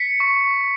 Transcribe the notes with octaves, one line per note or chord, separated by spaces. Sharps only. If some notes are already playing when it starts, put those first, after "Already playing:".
Already playing: B6 C#7
C#6